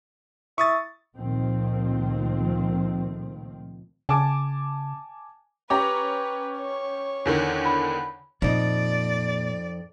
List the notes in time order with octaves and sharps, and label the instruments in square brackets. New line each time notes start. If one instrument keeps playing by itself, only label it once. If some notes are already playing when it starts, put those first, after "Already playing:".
[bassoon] E4 [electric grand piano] C#6 D#6 A6
[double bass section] C#2 A#2 D#3 F3 A3 C4
[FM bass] C#3 [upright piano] G#5 A5 D6
[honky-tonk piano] C#4 G4 A#5 [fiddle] B4 [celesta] D6
[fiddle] C#5
[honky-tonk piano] E2 D3 D#3
[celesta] B5
[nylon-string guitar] F2 D#4 [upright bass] A#2 [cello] D5